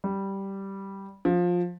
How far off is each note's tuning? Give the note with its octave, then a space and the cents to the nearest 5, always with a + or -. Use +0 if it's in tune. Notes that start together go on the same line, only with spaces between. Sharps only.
G3 -5
F3 +15